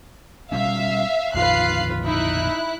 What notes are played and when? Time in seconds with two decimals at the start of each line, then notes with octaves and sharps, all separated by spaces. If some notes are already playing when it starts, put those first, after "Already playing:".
0.52 B2 G3 C#4 E5 F5
1.35 A#1 F2 D#3 F4 B4 F5 F#6 C7
2.04 D#4 E4 F#6